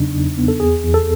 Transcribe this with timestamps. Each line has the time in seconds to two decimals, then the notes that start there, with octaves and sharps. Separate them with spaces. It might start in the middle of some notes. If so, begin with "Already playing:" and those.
Already playing: E2 C#3 F#3 B3 D4 D#4
0.15 E2
0.38 B3
0.48 A4
0.60 E2 G#4
0.83 E2
0.94 A4